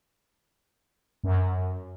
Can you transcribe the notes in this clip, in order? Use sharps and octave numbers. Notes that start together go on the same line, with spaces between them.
F#2